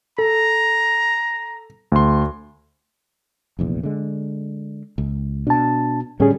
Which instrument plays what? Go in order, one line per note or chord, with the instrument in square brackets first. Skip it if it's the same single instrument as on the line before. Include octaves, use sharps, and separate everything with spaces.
[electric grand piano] A4 [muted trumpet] A#5
[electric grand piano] D2 C6
[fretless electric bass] F1 A#1 E2
D3 G#3
C#2
[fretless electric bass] B2 [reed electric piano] D4 A5
[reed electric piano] A2 C#4 G#4 [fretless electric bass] D3 G3